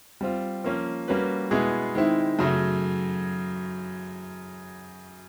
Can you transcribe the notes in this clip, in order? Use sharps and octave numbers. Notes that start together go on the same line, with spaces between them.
G3 C4 F4
F3 A#3 C#4
G3 A#3 C#4 F#4 B4
B2 G#3 B3 E4 G#4
D#3 G#3 C4 E4
F#2 C#3 F#3 A3